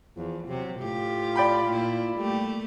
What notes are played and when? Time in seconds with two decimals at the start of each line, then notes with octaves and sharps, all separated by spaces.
0.17 E2 F3
0.48 C3 F#3
0.80 A2 F4 G4
1.36 D5 G5 B5
1.69 A#2 E4
2.17 G3 A3 A#3 G4